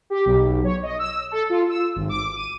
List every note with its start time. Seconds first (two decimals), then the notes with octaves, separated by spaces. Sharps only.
0.10 G4
0.26 B1
0.64 C#5
0.83 D#5
0.99 E6
1.31 A4
1.50 F4
1.69 E6
1.96 G#1
2.09 D6
2.37 D#7